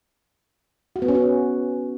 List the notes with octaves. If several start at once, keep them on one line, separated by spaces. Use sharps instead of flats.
F#4
B3
C#4
F#4